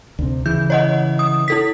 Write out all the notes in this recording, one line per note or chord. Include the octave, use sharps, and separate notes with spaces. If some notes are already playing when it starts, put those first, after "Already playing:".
D2 C3
C#3 E3 G6
C#5 D#5 F#5
D#6
E4 A4 B6